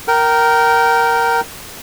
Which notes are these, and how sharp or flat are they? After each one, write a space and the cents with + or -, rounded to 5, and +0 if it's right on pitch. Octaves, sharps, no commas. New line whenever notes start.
A#4 +0 G5 -25